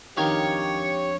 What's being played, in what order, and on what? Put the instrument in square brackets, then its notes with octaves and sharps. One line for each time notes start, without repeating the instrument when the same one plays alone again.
[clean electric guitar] F2 D4 F5 [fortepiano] D#3 [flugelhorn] G4 [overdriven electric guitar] C#5